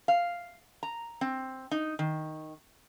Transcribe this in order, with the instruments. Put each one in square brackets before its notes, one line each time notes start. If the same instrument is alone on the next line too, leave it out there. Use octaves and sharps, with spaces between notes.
[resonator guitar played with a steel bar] F5
A#5
C4
D#4
D#3